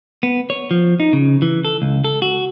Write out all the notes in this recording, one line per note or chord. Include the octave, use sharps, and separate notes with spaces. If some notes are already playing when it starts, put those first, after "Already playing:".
B3
C#5
F3
D#4
C#3
E3
A4
C#2
A4
F#4